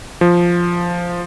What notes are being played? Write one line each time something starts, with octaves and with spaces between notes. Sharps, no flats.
F3